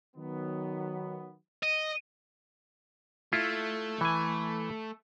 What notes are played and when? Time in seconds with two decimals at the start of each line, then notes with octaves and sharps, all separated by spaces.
0.16 D#3 F#3 B3
1.63 D#5
3.33 A3 E4 F4
4.01 E3 G#5